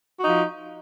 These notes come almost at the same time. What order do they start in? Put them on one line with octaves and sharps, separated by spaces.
F#4 D#4 F3